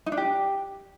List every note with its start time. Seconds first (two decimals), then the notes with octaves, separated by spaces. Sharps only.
0.06 D#4
0.12 D4
0.17 G4